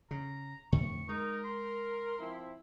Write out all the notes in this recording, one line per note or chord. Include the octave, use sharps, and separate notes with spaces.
C#3 A#5
F2 A2 D3 C#6
G#3 D#4 A#4
C6
F3 C4 E4